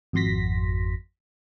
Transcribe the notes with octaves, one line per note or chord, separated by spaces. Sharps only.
G#1 F2 F#4 C6 A#6 B6